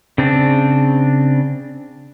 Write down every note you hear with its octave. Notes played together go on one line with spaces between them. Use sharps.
C#3 C4 D4